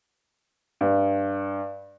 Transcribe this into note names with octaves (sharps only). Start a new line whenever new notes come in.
G2